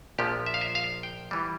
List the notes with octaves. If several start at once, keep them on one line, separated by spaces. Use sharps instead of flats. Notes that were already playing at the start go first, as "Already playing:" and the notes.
A#1 A#2 F3 G4
E5
F5
E5
F5
G5
E3 G3